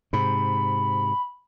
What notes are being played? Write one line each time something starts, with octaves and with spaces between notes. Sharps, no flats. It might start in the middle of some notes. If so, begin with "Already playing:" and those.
G#2 C3 B5